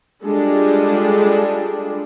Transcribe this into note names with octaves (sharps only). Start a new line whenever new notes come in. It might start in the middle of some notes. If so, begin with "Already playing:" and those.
G3 G#3 D4 F4 A4